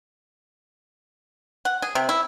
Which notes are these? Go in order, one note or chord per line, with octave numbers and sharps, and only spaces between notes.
F#5
G#4
C3
E4